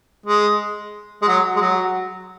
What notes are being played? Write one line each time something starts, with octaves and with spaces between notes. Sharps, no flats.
G#3
G#3
F#3
G#3
F#3